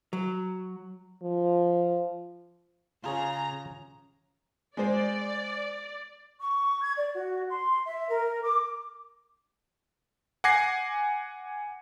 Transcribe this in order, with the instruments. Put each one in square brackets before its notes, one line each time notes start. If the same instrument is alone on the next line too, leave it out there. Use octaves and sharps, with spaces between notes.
[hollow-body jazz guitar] F#3
[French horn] F3
[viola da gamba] C#3 [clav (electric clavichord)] F4 G#4 C#5 [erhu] A#5
[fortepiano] G#3 C5 [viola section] D5
[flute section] C#6
G#6
D5
F#4
C6
E5
A#4
D6
[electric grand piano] F#5 G#5 D6 G#6 A#6 C7